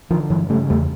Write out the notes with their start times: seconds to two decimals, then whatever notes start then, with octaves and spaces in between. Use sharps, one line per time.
0.10 D3 D#3 F3
0.30 G2 E3 F#3
0.49 C#3 G3 A3
0.70 E2 G3 A3